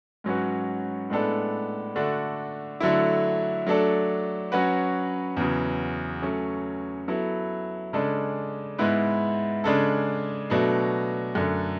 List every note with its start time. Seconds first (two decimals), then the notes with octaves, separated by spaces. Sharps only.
0.24 G#2 F#3 C#4 F#4 B4
1.10 A2 G#3 B3 D4 A4
1.96 D3 A3 D4 F#4
2.80 D3 F#3 A3 E4
3.67 F#3 A3 D4 A4
4.52 F#3 C#4 F#4 B4
5.37 E2 C#3 F#3
6.22 F#3 A3 C#4
7.08 F#3 B3 E4 A4
7.93 C#3 G#3 D4 A4
8.78 G#2 G#3 B3 E4 B4
9.64 C#3 G#3 D4 A4
10.50 B2 F#3 A3 D4
11.35 F#2 D3 A3